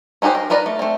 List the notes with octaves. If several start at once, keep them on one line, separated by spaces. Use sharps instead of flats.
C#4 D#4 F#4 G4 C5
A#4
D#4 A#4 B4 D5 D#5
A3
A3 C4